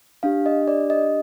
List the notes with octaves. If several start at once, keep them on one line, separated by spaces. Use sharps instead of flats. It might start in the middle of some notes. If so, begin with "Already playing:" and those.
D4 G4 F5
D#5
D5
D#5